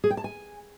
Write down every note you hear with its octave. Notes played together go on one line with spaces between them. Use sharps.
G#4
G5
A5
G#5